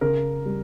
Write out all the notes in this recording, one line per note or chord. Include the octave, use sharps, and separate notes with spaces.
C#3 A#4
G3